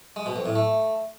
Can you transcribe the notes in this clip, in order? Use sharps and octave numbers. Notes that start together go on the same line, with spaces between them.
G#3
B2
F2
A2
A3